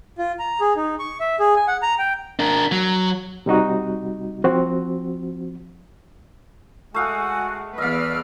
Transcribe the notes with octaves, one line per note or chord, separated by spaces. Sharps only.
F4
A#5
G#4
D#4
C#6
E5
G#4
G#5
F#5
A#5
G5
D4 A#4
F#3
C3 G3 D#4 F#4
F3 C4 F#4
G#3 A3 F#4 F5 F#5 G#5 D#6
E2 B4 D5 D#5 F5 E6 F6